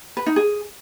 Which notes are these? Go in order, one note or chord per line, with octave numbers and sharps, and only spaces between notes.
B4
D#4
G#4